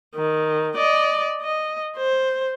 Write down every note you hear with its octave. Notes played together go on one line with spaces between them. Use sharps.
D#3
D5 D#5
D#5
C5